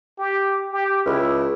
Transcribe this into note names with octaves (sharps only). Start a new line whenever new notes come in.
G4
G4
C#2 E4